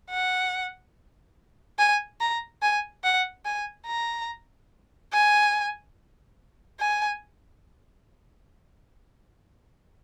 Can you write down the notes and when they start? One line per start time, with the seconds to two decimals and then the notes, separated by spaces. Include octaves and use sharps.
0.11 F#5
1.79 G#5
2.21 A#5
2.62 G#5
3.04 F#5
3.45 G#5
3.87 A#5
5.13 G#5
6.80 G#5